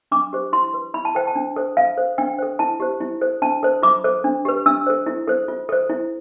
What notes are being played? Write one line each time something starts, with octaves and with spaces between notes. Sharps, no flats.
D4 D6
G4 C5
E4 C6
B4
E4 B5
A5
A4 C5 G5
A5
D4
A4 C5
F4 F5
A4 C5
D4 G5
A4 C5
E4 A5
G4 C5
E4
A4 C5
D4 A5
A4 C5
F4 D6
A4 C5
D4
G4 B4
D4 E6
A4 C5
E4
A4 C5
F4
A4 C5
E4